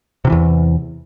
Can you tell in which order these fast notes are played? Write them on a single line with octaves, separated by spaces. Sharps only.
C3 D#3 E3 E2